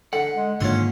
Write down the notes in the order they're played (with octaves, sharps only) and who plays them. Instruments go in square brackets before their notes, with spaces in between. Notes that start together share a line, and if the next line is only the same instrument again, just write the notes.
[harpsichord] D3 [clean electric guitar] F#5
[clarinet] G#3
[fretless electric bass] G#2 [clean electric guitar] D3 D#3 F4 [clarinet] A#3 [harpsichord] C#4 F#5